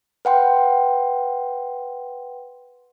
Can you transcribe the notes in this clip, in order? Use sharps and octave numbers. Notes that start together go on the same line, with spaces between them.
B4 F#5 G5 C6